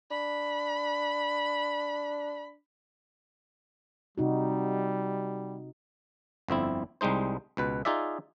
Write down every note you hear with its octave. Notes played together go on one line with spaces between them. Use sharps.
D4 B5
C3 G3 D#4 F#4
G1 F2 C4 E4
C2 G3 G#3 D#4 C5
C#2 B2 B4
D#4 F4 G#4 D5 E5